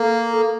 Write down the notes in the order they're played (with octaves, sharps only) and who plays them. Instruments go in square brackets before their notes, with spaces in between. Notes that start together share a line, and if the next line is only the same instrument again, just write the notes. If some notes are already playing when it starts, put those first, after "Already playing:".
Already playing: [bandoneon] A#3 [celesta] A4
[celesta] A4